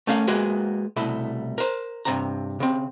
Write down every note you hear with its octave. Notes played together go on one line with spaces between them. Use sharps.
A3 C#4 A#4 F5
G#3 A#3 B3 F#4 G#4
C2 B2 A3 E4
A#4 C5
G2 C3 A#5
C#3 C4